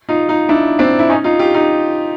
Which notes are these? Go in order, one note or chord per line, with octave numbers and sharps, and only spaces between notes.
D#4 F4
D#4 F4
D4 E4
C4 D4
E4
C#4 D#4
D#4 F4
F4 G4
D#4 F4